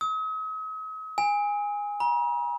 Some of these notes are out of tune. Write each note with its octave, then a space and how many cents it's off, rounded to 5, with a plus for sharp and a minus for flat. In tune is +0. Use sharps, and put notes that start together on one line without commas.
D#6 +45
G#5 -15
A#5 +45